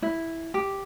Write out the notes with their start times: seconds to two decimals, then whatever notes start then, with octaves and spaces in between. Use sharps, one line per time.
0.02 E4
0.54 G4